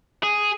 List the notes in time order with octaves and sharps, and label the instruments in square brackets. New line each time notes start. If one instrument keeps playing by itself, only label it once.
[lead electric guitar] G#4